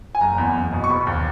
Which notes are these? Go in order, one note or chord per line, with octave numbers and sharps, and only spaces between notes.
G#5
F#1 A#5
E2
F#1
B2
C#6
E1 B5
D#2